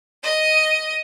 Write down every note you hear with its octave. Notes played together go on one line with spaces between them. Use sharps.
D#5 D#6